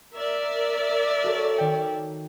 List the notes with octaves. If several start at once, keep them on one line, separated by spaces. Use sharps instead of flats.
A#4 D5 E5
F#4 A4 C#5
D#3 G5 C#7